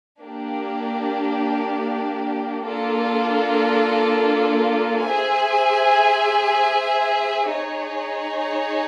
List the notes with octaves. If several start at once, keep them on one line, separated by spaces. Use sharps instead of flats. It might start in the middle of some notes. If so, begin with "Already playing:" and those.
A#3 D4 G4
A#3 D4 F4 A4
G#4 C5 E5 G#5
D#4 G#4 C#5